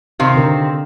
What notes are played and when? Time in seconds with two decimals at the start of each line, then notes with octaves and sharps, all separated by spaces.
0.20 C3 D#3 C4 F5
0.35 D3 A#4 C5